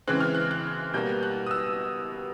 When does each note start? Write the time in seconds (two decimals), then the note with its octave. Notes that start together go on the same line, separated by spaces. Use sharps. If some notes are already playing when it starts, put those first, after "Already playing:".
0.07 C#3 E3 G#3 C4 F#6
0.20 F6
0.35 F#6
0.51 F#6
0.93 B2 G3 A#3 G6
1.23 F#6
1.46 D#6
1.51 E6